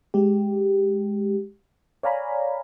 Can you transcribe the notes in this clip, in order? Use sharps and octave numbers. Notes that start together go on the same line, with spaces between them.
G#3 G4
C#5 D5 F5 G#5 A#5 B5